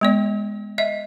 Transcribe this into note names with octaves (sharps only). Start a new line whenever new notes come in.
G#3 B3 D5
D#5 E5